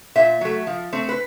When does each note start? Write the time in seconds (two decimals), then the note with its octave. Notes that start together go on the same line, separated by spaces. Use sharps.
0.16 A#2 E5
0.41 F#3 A3
0.67 F3
0.93 A3 C4
1.09 B4